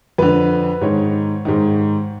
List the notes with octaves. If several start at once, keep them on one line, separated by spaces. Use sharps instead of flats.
F2 D3 B4
G#2 D#3 C#5
G#2 D#3